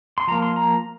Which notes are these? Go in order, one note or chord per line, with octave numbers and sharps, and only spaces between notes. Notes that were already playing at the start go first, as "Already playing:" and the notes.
C6
F3 A#3 A#5
C6
A#5